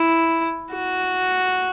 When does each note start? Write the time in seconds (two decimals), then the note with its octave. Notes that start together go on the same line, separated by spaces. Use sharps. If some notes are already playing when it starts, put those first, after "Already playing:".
Already playing: E4
0.71 F#4